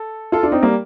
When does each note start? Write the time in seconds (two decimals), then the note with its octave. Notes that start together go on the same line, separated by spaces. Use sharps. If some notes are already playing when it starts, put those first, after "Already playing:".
Already playing: A4
0.32 F4 A4
0.43 D4 F4
0.52 C4 D#4
0.63 G3 A#3